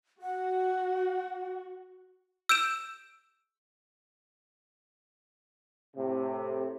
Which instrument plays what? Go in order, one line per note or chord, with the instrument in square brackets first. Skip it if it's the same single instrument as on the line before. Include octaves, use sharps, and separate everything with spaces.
[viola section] F#4 [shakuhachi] F#5
[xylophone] E6 G6 D7 E7
[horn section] A2 C3